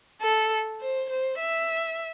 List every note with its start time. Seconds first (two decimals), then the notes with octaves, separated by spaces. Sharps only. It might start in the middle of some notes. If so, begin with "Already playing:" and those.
0.21 A4
0.81 C5
1.10 C5
1.40 E5